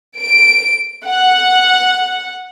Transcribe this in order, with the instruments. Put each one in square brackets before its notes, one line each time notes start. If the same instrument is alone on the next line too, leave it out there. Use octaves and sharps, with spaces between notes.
[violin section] D7
F#5